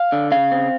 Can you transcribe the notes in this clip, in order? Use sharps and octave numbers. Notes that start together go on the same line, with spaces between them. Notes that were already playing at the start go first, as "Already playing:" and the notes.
Already playing: F5
D3
C#3 F5
C4